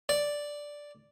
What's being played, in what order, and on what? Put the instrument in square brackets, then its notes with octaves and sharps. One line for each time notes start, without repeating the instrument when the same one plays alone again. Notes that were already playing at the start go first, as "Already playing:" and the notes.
[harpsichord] D5